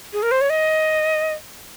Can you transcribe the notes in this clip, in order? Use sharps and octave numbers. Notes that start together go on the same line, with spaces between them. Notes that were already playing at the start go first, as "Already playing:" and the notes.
G#4
A#4
C5
C#5
D#5